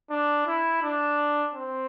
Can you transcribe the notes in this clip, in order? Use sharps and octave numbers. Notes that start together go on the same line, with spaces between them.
D4
E4
D4
C4